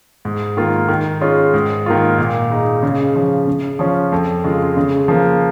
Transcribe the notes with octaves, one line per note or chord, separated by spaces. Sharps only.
G#2
D#3 A#3 F4
D#3
G#3 C#4 F4
G#2
D#3 A#3 F4
A#2
G#3 D#4
C#3
F3 C#4
C#3
F3 C#4 F4
F2
C#3 G#3 F4
C#3
F3 A#3